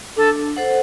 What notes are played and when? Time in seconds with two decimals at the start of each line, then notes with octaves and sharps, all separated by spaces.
0.17 D4 A4
0.57 A4 C5 F#5